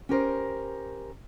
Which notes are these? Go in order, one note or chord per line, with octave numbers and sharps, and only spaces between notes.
C#4 G4 A#4 C5